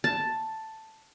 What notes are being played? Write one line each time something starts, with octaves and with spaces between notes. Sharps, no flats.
A5